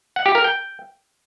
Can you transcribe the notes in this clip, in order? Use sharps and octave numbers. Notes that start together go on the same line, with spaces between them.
F#5
G4
A#4
G5